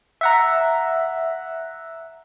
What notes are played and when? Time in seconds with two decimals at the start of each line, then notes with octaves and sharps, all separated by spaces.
0.21 E5 F#5 A#5